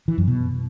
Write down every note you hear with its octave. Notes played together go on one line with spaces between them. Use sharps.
E3
F#2
B2